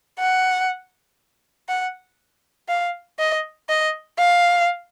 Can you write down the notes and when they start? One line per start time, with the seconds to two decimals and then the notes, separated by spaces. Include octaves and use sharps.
0.19 F#5
1.68 F#5
2.69 F5
3.19 D#5
3.69 D#5
4.19 F5